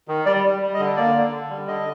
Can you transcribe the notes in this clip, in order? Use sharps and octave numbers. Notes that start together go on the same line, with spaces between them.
D#3
G3 D5
G3
G3
D#5
D3
A#3 D5
D3
D3
G3
D3 D#5